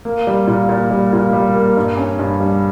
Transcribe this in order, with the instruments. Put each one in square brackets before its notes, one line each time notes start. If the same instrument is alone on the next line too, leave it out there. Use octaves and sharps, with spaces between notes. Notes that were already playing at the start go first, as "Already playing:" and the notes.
[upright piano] A#3
G3
A#2
A#2
G3
A#2
G3
A#3
G2
C#4
G2
G3